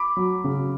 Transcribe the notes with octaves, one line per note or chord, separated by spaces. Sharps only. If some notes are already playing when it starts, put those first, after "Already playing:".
Already playing: B5 D6
F#3
C#3